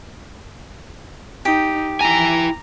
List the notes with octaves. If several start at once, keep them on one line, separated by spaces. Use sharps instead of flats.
D#4 G4
E4 G#5 A#5